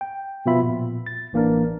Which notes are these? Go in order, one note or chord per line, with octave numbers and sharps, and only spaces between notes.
G5
B2 F3 B3 F4 E5 B5
A#2
A6
A1 E3 A#3 D4 A#4